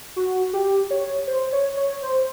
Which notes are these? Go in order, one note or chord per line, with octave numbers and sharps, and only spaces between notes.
F#4
G4
C#5
C5
C#5
C#5
C5